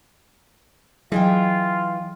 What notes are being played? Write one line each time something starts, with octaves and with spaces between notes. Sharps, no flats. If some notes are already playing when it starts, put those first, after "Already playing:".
E3 F#3 F4 G#4 D#5 G5